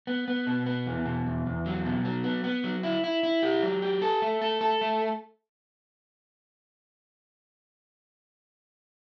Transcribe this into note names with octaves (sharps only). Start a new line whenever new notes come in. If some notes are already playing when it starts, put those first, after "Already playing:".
B3
B3
B2
B3
E2
B2
E2
E2
F#3
B2
F#3
B3
B3
F#3
E4
E4
E4
G4
F#3
G4
A4
A3
A4
A4
A3